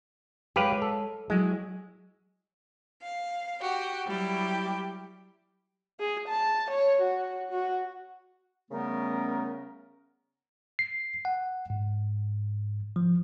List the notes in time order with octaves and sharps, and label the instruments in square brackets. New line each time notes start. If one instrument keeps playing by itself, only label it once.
[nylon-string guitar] G#3 C#5 [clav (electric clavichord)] G4 B4 F5
[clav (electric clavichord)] A4
[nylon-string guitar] F#3 E4 [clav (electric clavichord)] G#3
[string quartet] F5
F#4 G4
F#3 G3 E4 G4
[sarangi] G#4
A5
C#5
F#4
F#4
[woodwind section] C#3 G3 A3 B3 C#4 A#4
[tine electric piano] C7
F#5
G#2
F3